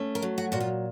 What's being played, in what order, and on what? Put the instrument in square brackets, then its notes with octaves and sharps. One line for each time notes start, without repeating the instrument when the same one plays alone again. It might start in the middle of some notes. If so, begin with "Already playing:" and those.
Already playing: [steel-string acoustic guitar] A3 C#4
A#4
F#3
F#4
A#2 F#4
F4